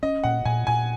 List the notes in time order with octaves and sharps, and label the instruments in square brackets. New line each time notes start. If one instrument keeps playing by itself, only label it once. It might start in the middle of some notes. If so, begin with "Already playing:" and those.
[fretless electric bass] C#4 [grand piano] D#5
[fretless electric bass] A#2 [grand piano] F#5
[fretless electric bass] A#2 [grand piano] G#5
[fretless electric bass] A#2 [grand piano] G#5